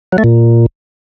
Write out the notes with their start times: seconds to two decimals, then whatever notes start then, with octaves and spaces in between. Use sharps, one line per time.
0.12 F#3
0.18 A3
0.24 A#2